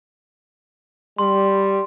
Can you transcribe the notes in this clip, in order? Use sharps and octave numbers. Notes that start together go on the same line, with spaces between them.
G3 C6